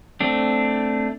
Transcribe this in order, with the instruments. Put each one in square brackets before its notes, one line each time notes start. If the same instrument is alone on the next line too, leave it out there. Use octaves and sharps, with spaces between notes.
[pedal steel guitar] A3 C4 D4